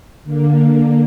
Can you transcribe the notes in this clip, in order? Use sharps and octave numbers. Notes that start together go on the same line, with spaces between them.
D3 A#3